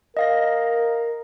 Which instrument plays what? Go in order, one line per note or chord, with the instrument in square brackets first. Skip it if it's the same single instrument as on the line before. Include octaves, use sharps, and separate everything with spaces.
[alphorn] A#4 [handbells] D#5 F5 A#6